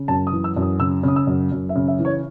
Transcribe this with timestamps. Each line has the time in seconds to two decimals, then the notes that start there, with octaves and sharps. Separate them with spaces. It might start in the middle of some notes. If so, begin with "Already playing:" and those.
Already playing: C#3
0.08 F#2 A5
0.27 D#6
0.32 E3
0.44 E6
0.56 F#2
0.62 D#6
0.80 C#3 E6
1.03 C#3 D#6
1.16 E6
1.27 F#2
1.52 F#2
1.69 E5
1.75 C#3
1.88 E5
1.99 E3
2.05 C#5